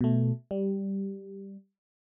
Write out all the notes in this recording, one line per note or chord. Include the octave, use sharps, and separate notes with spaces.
B2 A3
G3